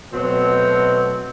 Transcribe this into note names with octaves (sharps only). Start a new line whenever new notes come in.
B2 F#3 A3 C4